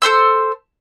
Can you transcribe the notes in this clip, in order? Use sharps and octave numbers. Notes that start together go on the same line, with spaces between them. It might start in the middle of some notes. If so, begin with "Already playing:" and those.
A4 C5 C6 E6